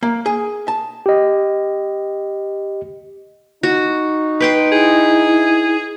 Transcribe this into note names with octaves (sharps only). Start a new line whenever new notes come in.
A#3
G#4
A5
G4 D#5
D#4 F#4
B4 G5 C6
E4 G#4